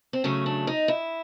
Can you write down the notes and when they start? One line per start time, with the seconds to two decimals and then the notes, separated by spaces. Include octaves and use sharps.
0.13 C4
0.24 C#3 F#3 A3 C#4
0.46 D4
0.67 D#4
0.88 E4